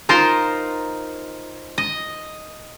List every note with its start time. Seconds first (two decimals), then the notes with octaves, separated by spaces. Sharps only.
0.09 D#4 F4 A#4 C5
1.78 D#5